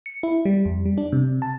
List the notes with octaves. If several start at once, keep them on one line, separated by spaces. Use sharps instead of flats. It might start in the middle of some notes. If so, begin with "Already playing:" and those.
C#7
E4
G3
F2
G3
D4
C3
A5